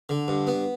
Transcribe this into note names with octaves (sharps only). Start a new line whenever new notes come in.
D3
G2
B3